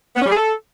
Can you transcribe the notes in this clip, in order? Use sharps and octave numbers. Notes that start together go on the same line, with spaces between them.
B3
C#4
G3
G#4
A4